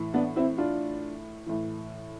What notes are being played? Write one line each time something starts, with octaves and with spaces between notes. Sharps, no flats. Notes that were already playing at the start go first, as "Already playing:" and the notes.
Already playing: A2 E3
B3 D4
C4 E4
D4 F4
A2 E3